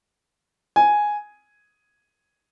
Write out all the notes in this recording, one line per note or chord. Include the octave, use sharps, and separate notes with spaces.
G#5